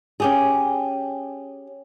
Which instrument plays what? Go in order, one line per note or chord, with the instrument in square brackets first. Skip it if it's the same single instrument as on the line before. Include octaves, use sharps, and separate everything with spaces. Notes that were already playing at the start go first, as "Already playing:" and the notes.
[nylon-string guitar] C#4 G4 G#4